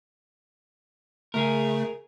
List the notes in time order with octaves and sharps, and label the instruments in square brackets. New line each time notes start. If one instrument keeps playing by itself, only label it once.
[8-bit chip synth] C#3 A3 [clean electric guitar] G#4 A#4